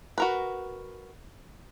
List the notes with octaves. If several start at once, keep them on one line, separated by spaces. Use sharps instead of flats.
F#4 A#4 B4